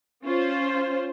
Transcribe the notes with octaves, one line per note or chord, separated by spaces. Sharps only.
C#4 F4 C5